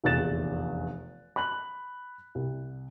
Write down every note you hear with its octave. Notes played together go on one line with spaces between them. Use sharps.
F1 A#1 E2 F#6 A6 E7
B5 F#6 F#7
C2